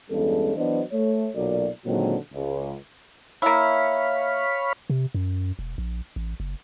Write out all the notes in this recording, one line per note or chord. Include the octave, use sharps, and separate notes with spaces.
E2 G2 G#3 C#4 A4
E3 F#3 B3 D4 C5 D#5
A3 C#5
B1 A#2 F#3 A#4 D5
A#2 D3 D#3 F#3 G#3 C4
C#2
A#3 E4 C#5 F5 B5
C3
F#2
E1
A#1
A1
F#1